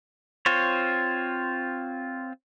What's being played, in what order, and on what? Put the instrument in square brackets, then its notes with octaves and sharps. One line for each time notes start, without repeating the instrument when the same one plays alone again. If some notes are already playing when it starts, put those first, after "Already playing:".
[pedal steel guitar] C4 F4 C5 C#5